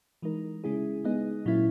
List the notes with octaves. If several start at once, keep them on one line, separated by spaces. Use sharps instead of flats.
E3 G#3 D#4 A#4
C#3 G#3 C#4 E4 G#4
G#3 B3 D#4 G#4 D#5
A#2 F#3 A#3 C#4 E4